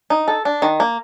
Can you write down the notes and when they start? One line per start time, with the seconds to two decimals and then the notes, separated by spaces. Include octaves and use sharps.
0.10 D#4
0.28 A4
0.45 D4
0.62 D#3
0.80 A#3